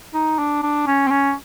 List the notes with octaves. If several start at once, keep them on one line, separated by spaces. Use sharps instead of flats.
D#4
D4
D4
C#4
C4
C#4